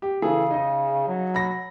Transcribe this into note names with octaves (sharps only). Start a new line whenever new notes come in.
G4
C#3 E3 G#4 A4
D#4 G#4 D#5
F#3
B5 A#6